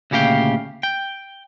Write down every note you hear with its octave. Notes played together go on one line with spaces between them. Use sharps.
D2 A#2 C#3 G4 F5 G5
G5